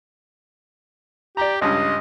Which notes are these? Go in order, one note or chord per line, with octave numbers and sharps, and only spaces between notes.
G4 D5 A#5
C#2 G2 D#5